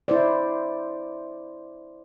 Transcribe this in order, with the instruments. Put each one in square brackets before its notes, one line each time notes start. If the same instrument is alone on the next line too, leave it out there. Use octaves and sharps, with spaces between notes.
[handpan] E4 C5 D5